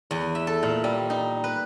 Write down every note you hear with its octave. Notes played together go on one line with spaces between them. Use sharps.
E2
E5
A4
A#2
G3
D#4
B4